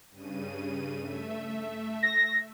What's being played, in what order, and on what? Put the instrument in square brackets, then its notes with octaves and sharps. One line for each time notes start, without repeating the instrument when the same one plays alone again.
[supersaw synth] G2 C#3 D#7
A3 E5
[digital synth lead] A#6